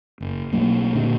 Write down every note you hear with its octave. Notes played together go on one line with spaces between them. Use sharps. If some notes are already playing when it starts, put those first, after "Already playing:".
F#1
B1 F#3 A#3
A#2 D3